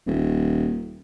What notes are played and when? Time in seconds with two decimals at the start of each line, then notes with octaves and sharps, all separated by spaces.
0.06 D#1